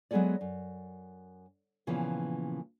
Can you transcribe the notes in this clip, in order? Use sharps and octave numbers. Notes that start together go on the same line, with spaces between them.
F#3 G#3 B3 G#4 A4 D5
F#2
A#2 C#3 E3 F3 A#3 B3